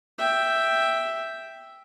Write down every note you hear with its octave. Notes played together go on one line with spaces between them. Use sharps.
E5 G5